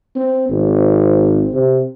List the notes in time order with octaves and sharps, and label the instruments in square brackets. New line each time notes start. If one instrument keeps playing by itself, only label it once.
[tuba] C4
[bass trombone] G#1 [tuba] C4
[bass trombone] C3